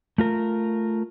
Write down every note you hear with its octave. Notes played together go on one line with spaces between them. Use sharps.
A3 F4 A#4